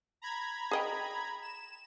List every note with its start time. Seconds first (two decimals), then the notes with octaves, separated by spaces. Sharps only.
0.22 A#5 B5 G#6
0.71 G#4 D#5 G5
1.42 E7